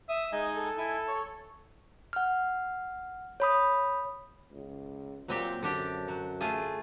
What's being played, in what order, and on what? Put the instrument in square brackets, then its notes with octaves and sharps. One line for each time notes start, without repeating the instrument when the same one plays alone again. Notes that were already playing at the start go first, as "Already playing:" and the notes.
[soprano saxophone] E5 [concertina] D#6
[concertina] G#3 D#4 G#5 [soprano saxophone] D#5
[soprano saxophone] A4
[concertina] E4 G#5
C#5
[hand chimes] F#5 F6
C#5 B5 D#6
[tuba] C#2
[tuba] A#2 [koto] F#3 C4 G4
[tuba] F#2 [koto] D3 D4 G4
[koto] F#3
A3 F4 G#4